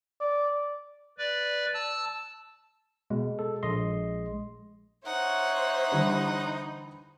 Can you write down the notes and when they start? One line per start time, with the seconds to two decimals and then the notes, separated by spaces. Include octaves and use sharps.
0.21 D5
1.18 B4 D5
1.74 A5 E6
3.10 B2 G#3
3.39 A4
3.63 A#1 D#5 C6
5.06 D#4 C5 C#5 E5 F#5
5.92 D3 E3 G3